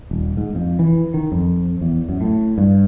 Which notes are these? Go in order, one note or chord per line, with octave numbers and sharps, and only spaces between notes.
D#1
G#2
F2
E3
D#3
F2
E2
F#2
A2
G2